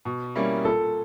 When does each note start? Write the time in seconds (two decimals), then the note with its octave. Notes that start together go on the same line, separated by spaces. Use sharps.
0.05 B2
0.35 G3 A#3 C#4 E4
0.65 A#2 A4